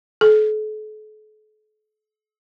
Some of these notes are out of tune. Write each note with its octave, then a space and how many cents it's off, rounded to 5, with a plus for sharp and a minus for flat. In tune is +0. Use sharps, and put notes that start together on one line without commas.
A4 -45